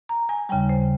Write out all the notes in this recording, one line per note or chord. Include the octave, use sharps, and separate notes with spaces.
A#5
G#5
D#2 C#3 G3 G5
C5